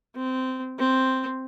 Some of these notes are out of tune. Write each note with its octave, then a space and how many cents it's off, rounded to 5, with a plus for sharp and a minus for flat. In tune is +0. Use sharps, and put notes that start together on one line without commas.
C4 -15
C4 +0